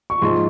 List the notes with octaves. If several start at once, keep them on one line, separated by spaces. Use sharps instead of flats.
C#6
G#2 F3 G#3 C6